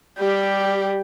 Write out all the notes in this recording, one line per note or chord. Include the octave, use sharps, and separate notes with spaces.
G3 G4